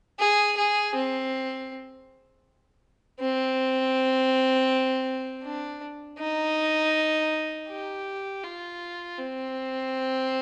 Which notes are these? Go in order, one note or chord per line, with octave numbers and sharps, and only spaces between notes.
G#4
G#4
C4
C4
D4
D#4
G4
F4
C4